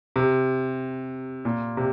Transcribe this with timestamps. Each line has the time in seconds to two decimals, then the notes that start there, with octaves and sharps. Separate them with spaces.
0.16 C3
1.45 A#2
1.77 C3